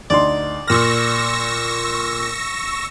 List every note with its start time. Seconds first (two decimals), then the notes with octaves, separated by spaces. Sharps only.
0.10 D2 D#4 D5 C6
0.67 A#2 C#6 E6 F6 A#6